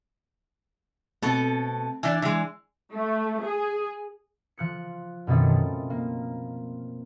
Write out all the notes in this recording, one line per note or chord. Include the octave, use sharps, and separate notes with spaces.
B2 A3 C4 A4
E3 D4 D5 G#5
E3 G#3
A3
G#4
F3 F#6 C#7
F#2 B2 D#3 A3 C4
F3
A#3